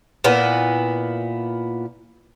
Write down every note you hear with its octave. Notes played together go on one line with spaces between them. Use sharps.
A#2 B3 E4